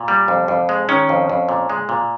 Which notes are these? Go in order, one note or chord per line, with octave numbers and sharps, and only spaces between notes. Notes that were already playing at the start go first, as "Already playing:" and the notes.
Already playing: A#2
G3
F2
F2
G#3
D#3 C#4
F2
F2
A#2
G#3
A#2